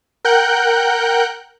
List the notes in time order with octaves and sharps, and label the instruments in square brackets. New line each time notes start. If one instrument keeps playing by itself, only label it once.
[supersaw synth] A#4 F#5 G5 F#6 G6